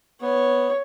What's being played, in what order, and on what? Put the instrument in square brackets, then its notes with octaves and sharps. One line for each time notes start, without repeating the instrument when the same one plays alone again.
[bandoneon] B3 [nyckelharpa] C#5